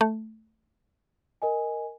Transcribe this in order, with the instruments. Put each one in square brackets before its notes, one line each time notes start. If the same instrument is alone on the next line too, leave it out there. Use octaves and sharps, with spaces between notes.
[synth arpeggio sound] A3
[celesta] A#4 D#5 G#5